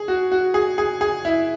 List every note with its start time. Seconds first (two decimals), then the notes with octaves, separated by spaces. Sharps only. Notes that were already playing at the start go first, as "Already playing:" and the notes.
Already playing: G#4
0.08 F#4
0.32 F#4
0.54 G#4
0.78 G#4
1.01 G#4
1.25 E4